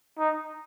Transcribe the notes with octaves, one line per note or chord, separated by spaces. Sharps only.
D#4